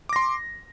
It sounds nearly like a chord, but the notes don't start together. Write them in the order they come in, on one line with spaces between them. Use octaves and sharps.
D6 A#6 C6